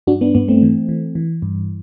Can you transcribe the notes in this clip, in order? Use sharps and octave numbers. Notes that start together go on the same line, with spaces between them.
G2 D4 F#4
B3 D4
G2 B3
A3 C4
E3
E3
E3
G2